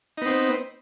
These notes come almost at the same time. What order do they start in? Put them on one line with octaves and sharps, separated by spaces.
D#4 B3 C4